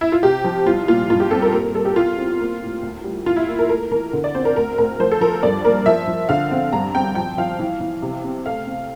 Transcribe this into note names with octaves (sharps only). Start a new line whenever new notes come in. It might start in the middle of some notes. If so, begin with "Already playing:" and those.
E4
F4
C3 G4
F3
C2 F4
A#2 F4
G2 F4
G4
C4 A4
A#4
A#3 A#4
G3 A4
G4
E2 F4
C4
A#3
A2
D2
G3
E3 F4
E4
A#3
A#4
A3 A#4
E3 A#4
D3
D5
C4 C5
A#4
D2 A#4
D2 A#4
F3 C5
A4
F3 A#4
G2 D5
A#3 A#4
F3 E5
F3
D3 F5
C4
G2 A#5
C4 G5
F3 G5
F3 F5
E3
E3
C3
C4
A3 F5
C4